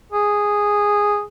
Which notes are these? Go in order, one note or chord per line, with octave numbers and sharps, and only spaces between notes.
G#4